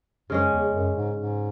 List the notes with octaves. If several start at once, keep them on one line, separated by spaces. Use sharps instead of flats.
F#2 C#3 G#3 C#4
E2
F#2
G#2
G#2